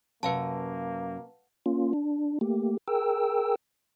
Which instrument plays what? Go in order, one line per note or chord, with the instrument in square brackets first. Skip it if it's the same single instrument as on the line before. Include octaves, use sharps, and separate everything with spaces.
[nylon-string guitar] F#2 [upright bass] C3 C#4 [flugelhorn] A#3 [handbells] B4 F5 A5
[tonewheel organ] A#3 C#4 F4
D4
A3 A#3 G4
G#4 A#4 G5 E6